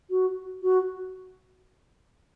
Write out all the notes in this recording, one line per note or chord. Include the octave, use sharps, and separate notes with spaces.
F#4
F#4